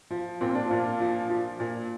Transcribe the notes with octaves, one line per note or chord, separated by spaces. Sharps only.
F3
A#2 C4
D4
A#2 D4 F4
F3
F3
A#2